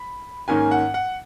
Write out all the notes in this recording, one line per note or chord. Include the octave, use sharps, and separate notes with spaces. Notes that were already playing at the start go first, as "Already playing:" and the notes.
Already playing: B5
G#2 D#3 A#3 C#4 G#5
F#5
F#5